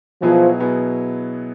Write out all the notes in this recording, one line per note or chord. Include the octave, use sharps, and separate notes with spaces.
B2 F3 F#3 B3 E4 G#4
B2 F#3 B3 E4 G#4